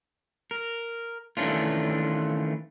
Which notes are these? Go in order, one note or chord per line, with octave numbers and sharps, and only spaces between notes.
A#4
D#3 E3 A3 C#4 D4 F4